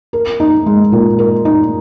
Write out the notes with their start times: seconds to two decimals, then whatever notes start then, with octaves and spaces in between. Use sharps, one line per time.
0.13 A#4
0.40 D#4
0.66 G#3
0.92 A#2
1.19 A#4
1.45 D#4